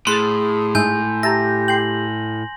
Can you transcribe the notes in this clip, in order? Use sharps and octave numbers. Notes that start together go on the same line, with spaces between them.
A2 G#4 C6 F#6 A6
G#2 E5 G#5 G6
G4 E5 A5 A#5 A#6
G5 C6 F#7